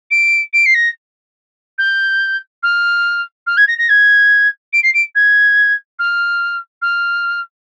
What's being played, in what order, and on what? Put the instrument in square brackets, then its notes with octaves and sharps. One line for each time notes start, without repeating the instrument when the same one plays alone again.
[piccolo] D7
D7
C7
A#6
G6
F6
F6
G#6
A#6
A#6
G#6
D7
C7
D7
G#6
F6
F6